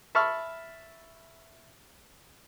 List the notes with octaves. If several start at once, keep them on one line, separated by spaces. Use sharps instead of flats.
E5 A5 B5 C#6 E6 F6